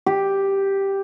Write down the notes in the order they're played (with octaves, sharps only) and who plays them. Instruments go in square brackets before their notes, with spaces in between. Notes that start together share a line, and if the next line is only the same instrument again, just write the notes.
[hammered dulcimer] G4